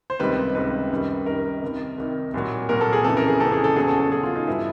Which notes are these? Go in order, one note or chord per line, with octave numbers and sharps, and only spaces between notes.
C5
C#2 C3 D#3 G3 B4
C#2 C3 D#3 G3 B4
F#2 D#3 G3
F#2 D#3 G3 A#4
C2 C3 D#3
C2 C3 D#3
C2 A#2 F#3
C2 A#2 F#3 A#4
A4
G#4
F2 C#3 E3 A4
A#4
G#4
F2 C#3 E3 A4
G#4
A4
E2 C#3 F#3 G#4
A4
A4
E2 C#3 F#3 G#4
F4
D#4
G2 E3 G3 E4